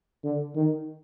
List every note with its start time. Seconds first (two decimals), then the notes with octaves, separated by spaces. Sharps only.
0.24 D3
0.55 D#3